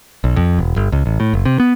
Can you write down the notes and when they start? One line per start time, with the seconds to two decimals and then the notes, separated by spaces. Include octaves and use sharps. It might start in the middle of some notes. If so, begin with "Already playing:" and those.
0.24 B1
0.36 F2
0.59 E1
0.76 G1
0.92 C#2
1.06 A1
1.20 A2
1.34 F#1
1.45 C3
1.60 B3